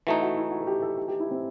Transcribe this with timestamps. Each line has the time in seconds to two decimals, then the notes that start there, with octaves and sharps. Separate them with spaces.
0.07 E3 A3 D#4 F#4
0.22 F#4
0.37 E4
0.52 F#4
0.60 A4
0.67 G4
0.82 A4
0.97 G4
1.08 G4
1.20 E4
1.31 C4